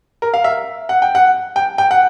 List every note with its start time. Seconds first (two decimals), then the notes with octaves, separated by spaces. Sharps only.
0.22 A#4
0.34 F5
0.44 E5
0.89 F#5
1.02 G5
1.15 F#5
1.56 G5
1.78 G5
1.91 F#5